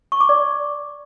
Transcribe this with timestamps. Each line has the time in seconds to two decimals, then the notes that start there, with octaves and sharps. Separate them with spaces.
0.12 C#6
0.21 D6
0.29 D5